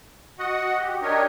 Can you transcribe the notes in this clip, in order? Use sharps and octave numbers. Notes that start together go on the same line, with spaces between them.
F#4 D#5 F#5
G4
D4 D#4 G4 A#4 C#5 D#5